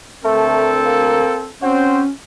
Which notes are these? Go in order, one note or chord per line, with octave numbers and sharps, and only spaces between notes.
D2 A3 C4 A4 A#4
A#3
C4 C#4 F#4 C5